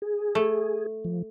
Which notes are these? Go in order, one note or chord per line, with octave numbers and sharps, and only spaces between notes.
G#4
A3
F3